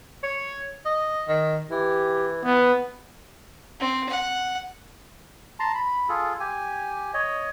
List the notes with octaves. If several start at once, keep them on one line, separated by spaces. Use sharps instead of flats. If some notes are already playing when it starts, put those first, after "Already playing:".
C#5
D#5
D#3
E3 G4
B3
C4
F#5
A5 A#5 C6
B5
F4 G#4 A4
G4 G#5
C#5 D#5